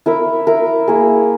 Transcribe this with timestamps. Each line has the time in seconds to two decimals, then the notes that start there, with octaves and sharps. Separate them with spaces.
0.06 E4 A#4 E5
0.47 E4 A#4 E5
0.88 A#3 E4 G#4